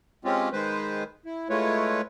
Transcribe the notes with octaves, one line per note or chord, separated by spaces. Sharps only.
G#3 C4 C#4 F4 G4
D#3 G#3 B4 C5
E4
G#3 A3 E4 F4 B4 C#5